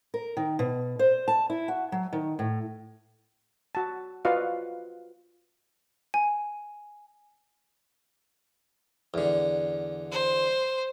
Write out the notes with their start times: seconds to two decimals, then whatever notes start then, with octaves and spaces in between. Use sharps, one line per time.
0.14 A#4
0.37 D#3
0.59 B2
0.99 C5
1.28 A5
1.50 E4
1.68 F#4
1.92 F#3
2.13 D#3
2.39 A2
3.75 F#4 A5
4.25 F4 F#4 B4 D5 D#5 F5
6.14 G#5
9.14 E2 D3
10.11 C5